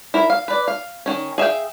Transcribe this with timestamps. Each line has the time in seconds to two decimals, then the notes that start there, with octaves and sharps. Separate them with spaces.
0.14 E4 A#4
0.30 F5
0.48 B4 D5
0.68 F5
1.06 D#3 C#4
1.38 G#4 E5 F5 G5